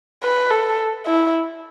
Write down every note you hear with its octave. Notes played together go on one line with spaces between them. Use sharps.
B4
A4
E4